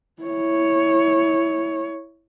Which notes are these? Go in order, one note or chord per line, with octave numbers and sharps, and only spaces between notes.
E4 C#5